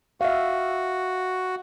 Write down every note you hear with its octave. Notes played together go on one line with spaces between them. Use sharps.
F#4 E5 F5